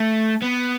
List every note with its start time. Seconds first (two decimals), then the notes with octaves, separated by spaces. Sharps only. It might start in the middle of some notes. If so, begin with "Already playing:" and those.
Already playing: A3
0.42 B3